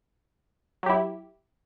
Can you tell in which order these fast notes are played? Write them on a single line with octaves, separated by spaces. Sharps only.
F#3 G4 E4